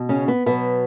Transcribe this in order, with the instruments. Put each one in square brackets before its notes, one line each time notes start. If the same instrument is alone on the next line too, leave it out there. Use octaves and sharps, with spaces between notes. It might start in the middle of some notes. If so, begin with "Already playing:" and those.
Already playing: [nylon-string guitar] B2
C#3 C#4
B3
B2 F#3 B3